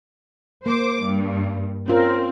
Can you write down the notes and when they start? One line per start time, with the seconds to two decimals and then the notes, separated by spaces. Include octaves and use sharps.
0.66 A#3 C5 D6
1.02 G2
1.88 C4 C#4 F4 A#4